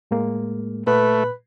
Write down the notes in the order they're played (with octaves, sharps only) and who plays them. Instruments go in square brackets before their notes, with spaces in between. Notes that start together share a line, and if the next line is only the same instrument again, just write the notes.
[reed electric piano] A2 G#3 A#3
[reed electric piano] A#2 [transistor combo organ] A3 [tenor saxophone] B4